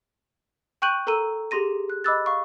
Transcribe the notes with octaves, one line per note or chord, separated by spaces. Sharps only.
G5 C#6 F#6 G6 D#7 F#7
A4 A#4 A#5 E6 D#7
G4 G#4 C6 A#6 D#7
F#6
D#5 B5 D6 E6 F#6 A6
F5 C#6